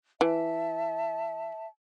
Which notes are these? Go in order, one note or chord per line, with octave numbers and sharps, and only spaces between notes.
E3 E5 A5